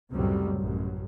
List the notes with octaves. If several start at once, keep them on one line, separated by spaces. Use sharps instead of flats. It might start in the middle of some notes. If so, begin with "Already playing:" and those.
C#2 F#2 A2 C3 F#3 G3
A1 F#2